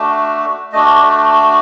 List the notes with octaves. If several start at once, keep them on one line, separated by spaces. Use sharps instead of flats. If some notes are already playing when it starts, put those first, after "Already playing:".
Already playing: A3 D4 F#4
A3 D4 F#4 D#5
D5